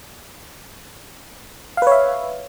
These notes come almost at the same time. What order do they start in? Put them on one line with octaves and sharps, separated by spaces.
F5 B4 C#5 E5